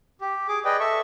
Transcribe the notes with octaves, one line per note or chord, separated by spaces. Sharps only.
G4
G#4 D6
G#4 B4 D5 D#5 G5
A4 E5 C#6